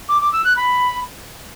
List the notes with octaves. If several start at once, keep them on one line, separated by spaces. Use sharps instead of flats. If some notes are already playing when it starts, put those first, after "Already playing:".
D6
D6
E6
F#6
B5